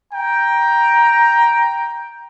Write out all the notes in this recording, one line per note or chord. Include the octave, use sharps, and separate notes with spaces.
G5 A#5